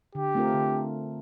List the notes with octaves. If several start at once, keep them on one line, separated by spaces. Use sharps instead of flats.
D3 G4
A3 C4 F4 A#4
D3